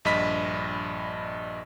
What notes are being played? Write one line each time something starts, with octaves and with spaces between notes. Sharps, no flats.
A#1 G2 D#5 B5 B6